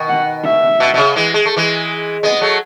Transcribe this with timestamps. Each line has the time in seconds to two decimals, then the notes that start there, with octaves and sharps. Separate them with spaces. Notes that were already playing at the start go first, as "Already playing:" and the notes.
Already playing: B2 D#3
0.08 F#5
0.44 E5
0.80 B2
0.94 B2
0.97 C#3
1.16 E3 G#3
1.34 G#3
1.45 A3
1.57 E3 G#3
2.23 G#3 B3 D#5
2.41 F#3 A3